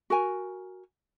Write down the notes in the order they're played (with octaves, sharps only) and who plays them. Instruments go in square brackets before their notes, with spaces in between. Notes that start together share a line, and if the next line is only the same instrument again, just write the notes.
[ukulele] F#4 A#4 G#5